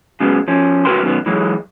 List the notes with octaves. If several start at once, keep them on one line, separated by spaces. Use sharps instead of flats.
C#3 F#3 G#3 B3
F3 C#4
C#3 F#4 A#4 B4 G5 C6
F#2 B2 D#3 B3
E3 F#3 G#3